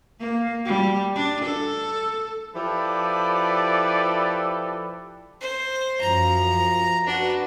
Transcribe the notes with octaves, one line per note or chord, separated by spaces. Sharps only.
A#3
G3
D4
A4
F3 E4 G4 A4 B4 D5
C5
F#2 F3 A#5
D4 F#4 B4